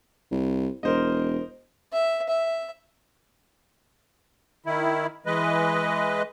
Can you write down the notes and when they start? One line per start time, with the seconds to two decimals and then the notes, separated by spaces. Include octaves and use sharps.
0.31 C2
0.83 E1 A#4 C5 D#5
1.92 E5
2.29 E5
4.66 D#3 E4
5.26 E3 G#3 B4 D#5